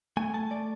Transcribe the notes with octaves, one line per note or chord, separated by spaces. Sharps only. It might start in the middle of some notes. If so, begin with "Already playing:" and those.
A3 G#5
A3 A5
A3 D5